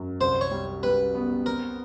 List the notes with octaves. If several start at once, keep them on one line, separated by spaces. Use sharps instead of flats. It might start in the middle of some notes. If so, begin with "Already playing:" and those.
Already playing: F#2
C2 C5
C#5
G3
G3 B4
B3
C4 A#4